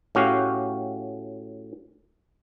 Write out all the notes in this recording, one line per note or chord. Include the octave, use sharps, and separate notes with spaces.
A2 C#4 F#4 G4 F5